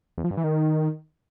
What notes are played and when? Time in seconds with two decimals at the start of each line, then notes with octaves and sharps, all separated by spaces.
0.18 E2
0.24 F3
0.31 G2
0.37 E3
0.44 D#3